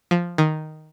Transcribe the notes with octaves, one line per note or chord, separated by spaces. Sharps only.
F3
D#3